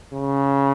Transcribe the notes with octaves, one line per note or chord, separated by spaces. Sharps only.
C#3